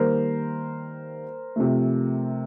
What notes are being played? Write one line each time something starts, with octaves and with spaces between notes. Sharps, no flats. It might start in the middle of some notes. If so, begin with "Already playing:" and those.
Already playing: D#3 G3 A#3 A#4 C5
C3 F3 A3